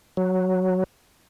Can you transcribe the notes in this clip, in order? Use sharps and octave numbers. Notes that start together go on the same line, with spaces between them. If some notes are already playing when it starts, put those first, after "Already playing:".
F#3